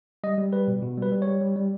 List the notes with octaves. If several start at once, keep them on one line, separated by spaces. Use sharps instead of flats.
G3 D#5
G3
G3 B4
B2
B2
G3 B4
G3
C#5
G3
G3
G3